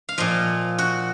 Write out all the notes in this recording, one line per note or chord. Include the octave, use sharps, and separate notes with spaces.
F5
A#2 F3 D#5
F#4